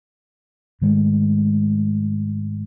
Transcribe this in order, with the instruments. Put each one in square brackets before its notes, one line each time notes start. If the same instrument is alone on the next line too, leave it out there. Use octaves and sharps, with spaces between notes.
[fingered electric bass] G#2 D#3 G#3 A3